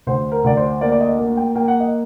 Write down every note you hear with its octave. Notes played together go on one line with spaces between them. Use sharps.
D2 C5
A#4
D2 D5
C5
A#3 D5
D5
D#5
A#3
G5
A#3 G5
F#5
D#5